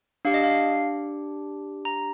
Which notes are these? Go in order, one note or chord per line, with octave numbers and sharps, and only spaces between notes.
D4 G4 F5
D#5
F5
A#5